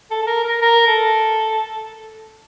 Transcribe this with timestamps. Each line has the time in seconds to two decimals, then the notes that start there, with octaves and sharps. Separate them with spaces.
0.11 A4
0.22 A4
0.27 A#4
0.44 A#4
0.62 A#4
0.87 A4